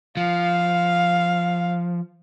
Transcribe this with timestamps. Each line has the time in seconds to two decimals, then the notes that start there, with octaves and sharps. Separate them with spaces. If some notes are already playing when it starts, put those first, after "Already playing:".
0.17 F3 F5